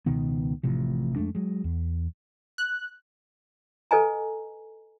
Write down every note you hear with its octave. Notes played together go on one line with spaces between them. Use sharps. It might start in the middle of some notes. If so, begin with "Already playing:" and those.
C#2 B2 D#3 B3
A1 A2 C3 F3
F2 G#3 A3 D4
F#3 G#3
E2
F#6
A4 B4 D#5 G#5 A#5